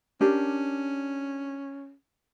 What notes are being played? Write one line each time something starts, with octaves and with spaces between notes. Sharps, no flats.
C#4 D4 G4 A#4